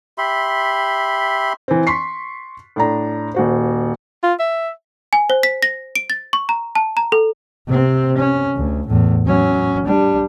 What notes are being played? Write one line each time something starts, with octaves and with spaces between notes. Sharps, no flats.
G4 E5 B5 C6
E3 C4
C6 C#6 B6 C7
A2 D4 A#5
D#1 F#4 C5
F4
E5
G#5
C5
B6
A#6
D7
A6
C#6
A#5
A5
A#5
A4
C3 C4
C#4
D2
E2 A2
F#3 C#4
G3 D4